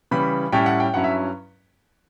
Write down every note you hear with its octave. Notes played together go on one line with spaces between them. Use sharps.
C#3 E3 G3 B5
A2 G3 C#4 E4 G5
F#5
G5
G2 F#3 C#4 E4 F#5
E5